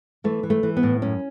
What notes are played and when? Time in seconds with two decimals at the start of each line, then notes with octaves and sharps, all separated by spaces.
0.24 E3 A3
0.43 E3
0.50 A3
0.63 E3
0.77 B3
0.83 A2
1.02 F#2 C#4